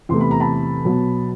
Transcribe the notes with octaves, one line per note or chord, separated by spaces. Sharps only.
E2 C3 E3 A3 C6
B5
A#5
A5 B5
B2 F#3 B3